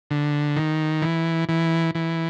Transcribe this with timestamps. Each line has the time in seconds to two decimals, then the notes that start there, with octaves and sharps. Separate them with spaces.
0.11 D3
0.57 D#3
1.02 E3
1.49 E3
1.95 E3